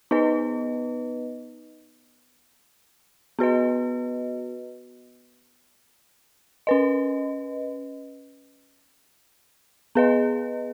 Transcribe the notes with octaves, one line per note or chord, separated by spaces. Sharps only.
B3 D#4 B4 D#5
B3 F#4 B4 D#5
C#4 B4 D#5
B3 G#4 B4 D#5